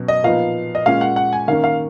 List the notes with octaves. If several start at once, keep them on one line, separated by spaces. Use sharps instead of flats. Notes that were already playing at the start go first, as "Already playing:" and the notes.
Already playing: B2 F#3 C#4
D#5
A#2 F3 B3 D#4 F5
D#5
A#2 G#3 C#4 F5
F#5
F#5
G#5
D#3 A#3 C#4 F5
F5